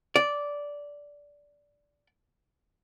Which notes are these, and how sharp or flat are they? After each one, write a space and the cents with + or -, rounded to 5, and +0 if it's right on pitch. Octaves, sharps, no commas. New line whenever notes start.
D5 -10